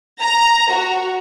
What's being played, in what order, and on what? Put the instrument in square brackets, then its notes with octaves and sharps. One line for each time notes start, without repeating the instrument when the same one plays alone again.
[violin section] A#5
F#4